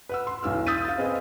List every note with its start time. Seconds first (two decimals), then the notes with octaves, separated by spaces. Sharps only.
0.09 B4 F#5 E6
0.27 C6
0.43 B1 E2 E6 F6
0.67 D#6 E6 G6 A6 B6 D#7
0.85 F5 A6
0.98 C4 G#4 B4 D#5